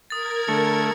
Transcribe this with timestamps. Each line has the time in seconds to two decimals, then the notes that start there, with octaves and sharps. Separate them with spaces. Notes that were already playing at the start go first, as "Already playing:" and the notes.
0.10 A#4 D#6 G#6 A6
0.48 D3 A3 C#7